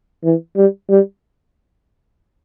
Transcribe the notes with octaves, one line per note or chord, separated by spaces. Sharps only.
E3
G3
G3